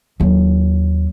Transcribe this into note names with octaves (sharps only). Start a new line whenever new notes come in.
D#2 F#3